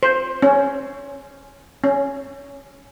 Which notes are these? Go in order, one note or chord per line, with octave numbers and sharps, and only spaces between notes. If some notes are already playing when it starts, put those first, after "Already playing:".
C5
C#4
C#4